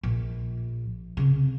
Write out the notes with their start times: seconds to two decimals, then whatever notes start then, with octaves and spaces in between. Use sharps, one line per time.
0.03 A#1
1.17 C2 C#3